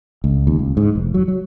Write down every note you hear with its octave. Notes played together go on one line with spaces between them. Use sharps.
C#2
D#2
C#2
G#2
F1
F#3
F#3